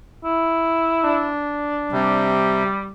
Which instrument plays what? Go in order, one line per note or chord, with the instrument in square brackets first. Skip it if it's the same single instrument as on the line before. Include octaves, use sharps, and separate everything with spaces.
[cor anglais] E4
[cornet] D4
[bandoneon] C3 [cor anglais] G3